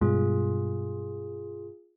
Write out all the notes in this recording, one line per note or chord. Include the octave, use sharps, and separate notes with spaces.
G2 B2 G#3 F4 G#4